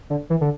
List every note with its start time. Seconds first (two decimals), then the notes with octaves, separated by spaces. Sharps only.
0.10 D3
0.30 E3
0.41 D3